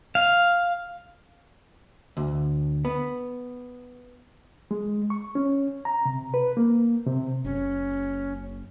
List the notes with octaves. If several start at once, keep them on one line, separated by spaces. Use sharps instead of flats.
F5
D2
B3
G#3
C#6
C#4
A#5
C3
B4
A#3
C3
F#1 C#4